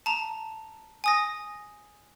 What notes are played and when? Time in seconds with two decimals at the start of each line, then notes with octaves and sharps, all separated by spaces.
0.06 A5 A#5
1.04 G#5 D#6 A#6